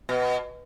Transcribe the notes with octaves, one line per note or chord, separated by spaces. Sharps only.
B2